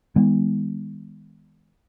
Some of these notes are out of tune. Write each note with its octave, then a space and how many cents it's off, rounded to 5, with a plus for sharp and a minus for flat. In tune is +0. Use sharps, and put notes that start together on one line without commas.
D#3 +25 G#3 -30 B3 +0